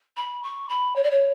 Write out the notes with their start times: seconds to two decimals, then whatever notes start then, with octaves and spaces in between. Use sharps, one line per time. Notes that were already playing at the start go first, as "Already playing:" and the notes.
0.16 B5
0.43 C#6
0.69 B5
0.95 C#5
1.03 D5
1.10 C#5